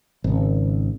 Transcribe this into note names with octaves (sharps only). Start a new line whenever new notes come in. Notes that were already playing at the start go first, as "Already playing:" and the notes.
G#1 C#3